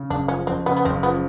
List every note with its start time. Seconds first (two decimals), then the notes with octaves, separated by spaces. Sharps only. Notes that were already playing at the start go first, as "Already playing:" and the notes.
Already playing: C#3
0.10 F#1 D4
0.28 F3 C#4
0.47 F2 C4
0.66 C#3 B3
0.77 B3
0.85 F#1 C4
1.03 F3 B3